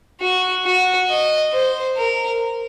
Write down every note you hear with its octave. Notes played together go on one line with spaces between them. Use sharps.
F#4
F#4
D#5
C5
A#4